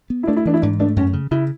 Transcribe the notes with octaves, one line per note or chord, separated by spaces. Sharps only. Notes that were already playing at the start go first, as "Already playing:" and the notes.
B3
E4
A3 D4
E4
E3 D4
E4
G#2 D4
A3 D4
F#2 C#4
C#3
C#3 E4